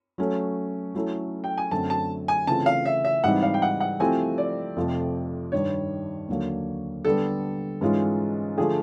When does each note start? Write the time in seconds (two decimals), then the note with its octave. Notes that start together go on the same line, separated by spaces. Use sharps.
0.18 F#3 A3 C#4
0.95 F#3 A3 C#4 E4 A4
1.44 G5
1.58 G#5
1.71 F#2 D3 F#3 A3 C4 A5
1.90 A5
2.28 G#5
2.47 C#3 E3 A3 C4 F4 A5
2.66 F5
2.85 E5
3.05 E5
3.24 G#2 E3 G3 C4 D#4 F#5
3.43 F5
3.54 G5
3.62 F#5
3.80 F#5
4.00 F3 A3 C4 E4 G4 G#5
4.38 D5
4.77 F2 C3 F3 A3
5.52 G2 D#3 G3 C#5
6.29 D#2 D3 F#3 A#3
7.05 D3 G3 B3 A4
7.81 G#2 E3 G#3 C#4 F4
8.58 D3 F3 A3 D4 G#4